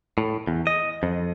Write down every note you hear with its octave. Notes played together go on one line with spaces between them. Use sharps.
A2
E2
D#5
F2